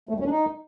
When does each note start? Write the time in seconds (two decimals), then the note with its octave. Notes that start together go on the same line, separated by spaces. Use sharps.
0.09 A3
0.15 G3
0.20 C#4
0.26 D4
0.31 D#4